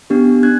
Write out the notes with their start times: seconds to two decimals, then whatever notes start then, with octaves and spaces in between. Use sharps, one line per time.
0.10 B3 D4 G4
0.43 D4 F#6 G#6